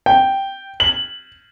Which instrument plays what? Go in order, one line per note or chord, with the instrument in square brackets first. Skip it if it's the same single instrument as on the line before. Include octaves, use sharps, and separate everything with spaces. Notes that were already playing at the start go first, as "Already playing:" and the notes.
[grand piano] G5
F#7